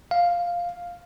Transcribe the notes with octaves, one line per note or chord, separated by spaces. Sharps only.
F5